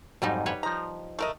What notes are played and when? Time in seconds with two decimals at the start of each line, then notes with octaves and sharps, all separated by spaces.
0.22 F2 G#2 F#3 G3 D#4 D#5
0.46 G3 B4 C#5
0.63 F3 D#4 A#5
1.19 A3 A#4 D#5